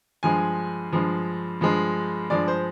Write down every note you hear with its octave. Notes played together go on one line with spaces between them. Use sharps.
G2 F3 G#3 G#5
G2 F3 G#3
G2 F3 G#3
G2 F3 G#3 D5
C5